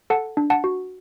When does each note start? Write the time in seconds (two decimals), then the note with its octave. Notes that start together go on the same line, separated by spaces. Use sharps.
0.10 A4 F#5 A5
0.37 D4
0.50 F#5 A5
0.64 F#4